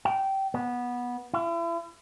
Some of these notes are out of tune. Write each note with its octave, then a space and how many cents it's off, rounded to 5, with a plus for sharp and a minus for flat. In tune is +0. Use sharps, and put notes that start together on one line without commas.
G5 -20
B3 -15
E4 +40